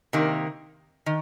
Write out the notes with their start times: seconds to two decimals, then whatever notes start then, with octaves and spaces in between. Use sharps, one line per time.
0.13 C3 D#3 A#3
1.06 D#3